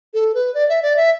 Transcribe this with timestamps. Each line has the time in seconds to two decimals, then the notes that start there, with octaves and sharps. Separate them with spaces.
0.14 A4
0.34 B4
0.54 D5
0.69 E5
0.82 D5
0.96 E5